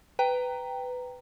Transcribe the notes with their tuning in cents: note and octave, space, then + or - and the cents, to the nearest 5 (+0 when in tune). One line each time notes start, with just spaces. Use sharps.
B4 +15 G5 +0 A#5 -5